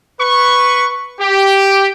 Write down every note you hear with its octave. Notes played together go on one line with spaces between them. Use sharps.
B4 C#6
G4